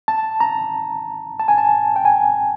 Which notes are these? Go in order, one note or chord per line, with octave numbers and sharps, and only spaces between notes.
A5
A#5
A5
G#5
A5
G5
G#5